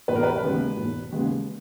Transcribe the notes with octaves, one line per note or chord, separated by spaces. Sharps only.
E1 B4
A#4
B4
D#2 C#3 G#3 B3
E1
D#2 C#3 G#3 B3